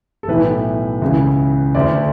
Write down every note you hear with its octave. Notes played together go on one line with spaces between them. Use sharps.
A4
B1 A2 E3 B4
C#2 C#3 E3
D2 D3 D5